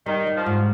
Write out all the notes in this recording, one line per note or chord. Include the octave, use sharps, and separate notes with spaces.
D#3 G3
G3
F3
G#2